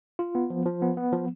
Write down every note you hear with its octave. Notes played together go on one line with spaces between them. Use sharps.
F4
B3
F3
F3
B3
B3
F3